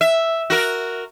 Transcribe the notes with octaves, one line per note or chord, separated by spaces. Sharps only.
E5
F#4 A#4